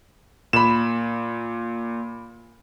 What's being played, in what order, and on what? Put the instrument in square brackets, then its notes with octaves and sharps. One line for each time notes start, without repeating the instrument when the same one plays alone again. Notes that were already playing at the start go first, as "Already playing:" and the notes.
[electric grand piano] A#2 [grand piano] B5 E7